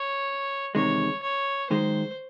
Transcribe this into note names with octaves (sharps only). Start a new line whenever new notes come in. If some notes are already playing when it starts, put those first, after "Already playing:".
Already playing: C#5
E2 C3 D#3 G#3 C#5
C#5
F#2 D#3 G#3 C5